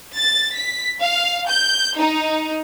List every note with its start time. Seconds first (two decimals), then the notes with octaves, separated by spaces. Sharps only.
0.16 A6
0.55 B6
1.00 F5
1.48 G6
1.97 D#4